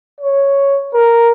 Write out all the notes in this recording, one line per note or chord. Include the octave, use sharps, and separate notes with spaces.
C#5
A#4